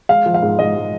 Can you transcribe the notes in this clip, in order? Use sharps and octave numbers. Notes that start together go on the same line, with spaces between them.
G#3 F5
F3
F5
G#2
G#2 D#5
G#3